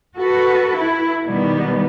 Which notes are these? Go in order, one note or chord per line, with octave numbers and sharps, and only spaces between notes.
F#4 A4 B4
E4
B2 D#3 G3 B3